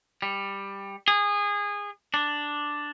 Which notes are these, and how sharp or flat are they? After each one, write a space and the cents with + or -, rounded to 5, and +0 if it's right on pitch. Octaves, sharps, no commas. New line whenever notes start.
G3 +10
G#4 -20
D4 +0